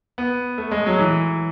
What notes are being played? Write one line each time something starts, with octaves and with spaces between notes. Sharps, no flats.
B3
A3
G#3
F#3
E3